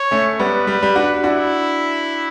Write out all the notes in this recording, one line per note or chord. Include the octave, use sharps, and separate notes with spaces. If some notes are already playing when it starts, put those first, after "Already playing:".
Already playing: C#5
A3 C#4
G3 B3 B4
G3
G3
D4 F#4
D4 E4 F#4